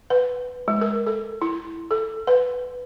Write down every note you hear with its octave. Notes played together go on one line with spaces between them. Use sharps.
B4
G#3
A#4
A4
E4
A4
B4